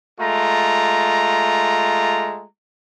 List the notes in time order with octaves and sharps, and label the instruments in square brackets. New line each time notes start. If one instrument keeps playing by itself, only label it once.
[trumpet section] G#3 A3 F4 A#5